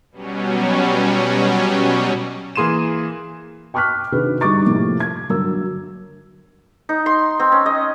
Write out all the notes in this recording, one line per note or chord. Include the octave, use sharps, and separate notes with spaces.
B2 F#3 G3 C#4
E3 A#3 G#4 C6 D#7 E7
G5 C#6 D6 F6 F#6 B6
C3 D#3 D4 F#4 G#4 B4
G1 G3 D#4 C#6 D6 A6
A2 C3 F3 A#3 G4
G#6
G1 F#3 A#4 E6
D#4
C6
C4
C#4
D#5